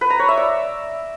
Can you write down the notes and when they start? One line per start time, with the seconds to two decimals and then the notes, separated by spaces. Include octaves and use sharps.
0.01 B4
0.10 A#5
0.19 C#5
0.28 E5
0.37 D5